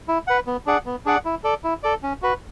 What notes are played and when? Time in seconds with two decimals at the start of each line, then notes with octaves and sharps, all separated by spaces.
0.08 E4
0.27 B4 F#5
0.47 B3
0.66 D4 G#4 D5 F#5
0.86 B3
1.06 D4 G#4 D5 F#5
1.25 E4
1.44 A4 D5
1.64 E4
1.83 A4 D5
2.03 C#4
2.22 F#4 B4